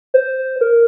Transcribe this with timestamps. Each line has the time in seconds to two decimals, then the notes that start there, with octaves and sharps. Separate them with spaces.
0.14 C5
0.61 A#4